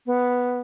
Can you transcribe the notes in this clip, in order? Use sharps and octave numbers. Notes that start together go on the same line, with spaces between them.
B3